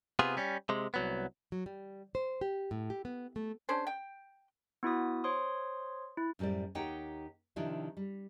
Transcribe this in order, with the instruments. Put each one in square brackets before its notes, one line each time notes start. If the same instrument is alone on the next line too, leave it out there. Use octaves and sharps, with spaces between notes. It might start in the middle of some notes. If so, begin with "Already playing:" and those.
[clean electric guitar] C3 B3 F4 G#4
G3 C#4
C3 G#3
C2 F#3 B3
[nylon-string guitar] F#3
G3
C5
G4
A2
G4
B3
A3
[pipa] C#4 D4 G#4 C5
G5
[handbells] B3 E4 F#4 D#6
C5 C#5 C6 D#6
E4
[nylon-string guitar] F#2 A2 G3 C5 D5
D#2 D#4 G4 C#5 F#5 G5
C3 D#3 F3 D4 E4 G4
G3